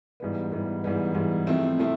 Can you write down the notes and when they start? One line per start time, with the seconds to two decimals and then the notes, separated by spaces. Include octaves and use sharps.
0.20 G#2 E3 G3 B3
0.52 G#2 E3 G3 B3
0.84 G#2 E3 G3 B3
1.15 G#2 E3 G3 B3
1.46 C3 F3 A3 C4 E4
1.78 C3 F3 A3 C4 E4